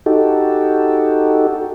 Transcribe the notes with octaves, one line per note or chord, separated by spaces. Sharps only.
D#4 F#4 G4 A4